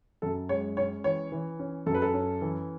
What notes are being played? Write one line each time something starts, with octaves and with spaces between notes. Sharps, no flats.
F#2 A4
G#3 C#5
C#4 C#5
E3 C#5
E3
C#4
F#2 A4
B4
A4
C#4
E3